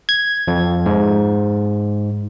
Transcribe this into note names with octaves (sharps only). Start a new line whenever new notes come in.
G#6
F2
G#2